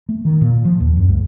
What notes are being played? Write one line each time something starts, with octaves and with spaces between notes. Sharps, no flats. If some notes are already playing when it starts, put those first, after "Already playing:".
A3
D#3
A#2
F3
D#2
F#2
C#2